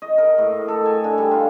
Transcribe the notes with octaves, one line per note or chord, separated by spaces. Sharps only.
D#5
A#4
A2
A4
G#5
D3
G3
F4